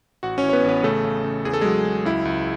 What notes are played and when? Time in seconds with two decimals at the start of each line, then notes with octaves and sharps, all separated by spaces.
0.23 A1 F#4 F#5
0.38 C#4 C#5
0.43 E3
0.49 C#5
0.53 B3 B4
0.64 A1 B3 B4
0.83 C#3 A3 A4
1.05 C#3
1.24 C#3
1.45 E2 G#4
1.53 A4
1.61 F#3 G#3 G#4
1.86 F#3
2.05 C#2 E4
2.25 C#2